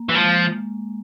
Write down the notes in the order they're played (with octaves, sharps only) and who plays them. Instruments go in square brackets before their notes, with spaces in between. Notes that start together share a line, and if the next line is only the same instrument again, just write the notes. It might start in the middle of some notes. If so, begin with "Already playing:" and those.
Already playing: [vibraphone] A#3
[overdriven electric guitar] E3
[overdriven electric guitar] F3 [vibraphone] G#3